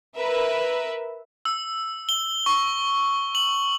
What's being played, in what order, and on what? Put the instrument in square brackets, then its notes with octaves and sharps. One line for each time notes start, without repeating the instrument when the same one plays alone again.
[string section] A#4 B4 E5
[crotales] E6
G7
C#6
F#7